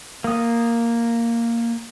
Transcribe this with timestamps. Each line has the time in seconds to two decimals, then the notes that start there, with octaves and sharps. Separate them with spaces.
0.24 A#3 D#6